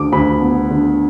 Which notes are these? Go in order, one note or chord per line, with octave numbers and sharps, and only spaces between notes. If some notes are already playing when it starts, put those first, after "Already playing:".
Already playing: D2 D3 D6
D2 B5
B3
D3